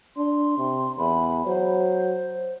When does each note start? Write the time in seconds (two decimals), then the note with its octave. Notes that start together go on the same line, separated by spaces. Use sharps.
0.17 D4 C6
0.57 C3
0.98 E2 B5
1.46 F#3 C5